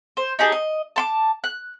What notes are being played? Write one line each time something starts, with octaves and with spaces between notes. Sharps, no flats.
C5
D#4 G4 G#4 A5
D#5
A5 C6 D6
F#6